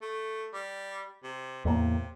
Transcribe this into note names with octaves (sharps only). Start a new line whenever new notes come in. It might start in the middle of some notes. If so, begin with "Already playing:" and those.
A3
G3
C3
E2 A2 C3 A#3